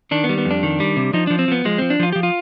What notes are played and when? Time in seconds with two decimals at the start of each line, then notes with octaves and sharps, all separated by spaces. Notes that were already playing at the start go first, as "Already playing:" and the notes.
0.11 D#3 D4
0.24 B3
0.29 G3
0.38 B3
0.45 F2
0.51 D4
0.63 D#3
0.80 G3
0.96 C3
1.13 F3 D#4
1.27 F3 D4
1.39 C4
1.48 F3 B3
1.65 F3 G#3
1.78 F3 C4
1.90 D4
2.00 F3 F4
2.12 F3 G4
2.23 F4